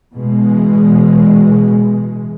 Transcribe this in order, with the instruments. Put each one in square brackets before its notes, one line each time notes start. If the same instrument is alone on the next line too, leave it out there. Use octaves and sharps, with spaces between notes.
[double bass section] B2 E3 G#3